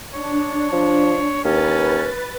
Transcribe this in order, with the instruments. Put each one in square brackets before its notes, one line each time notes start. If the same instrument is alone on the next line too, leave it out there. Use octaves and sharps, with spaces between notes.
[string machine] D4 [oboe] C#5
[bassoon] F3
[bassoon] D#2 [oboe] C#4 [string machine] B4 A6